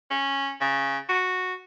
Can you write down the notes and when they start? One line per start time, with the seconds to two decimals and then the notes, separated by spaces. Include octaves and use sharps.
0.11 C#4
0.61 C#3
1.09 F#4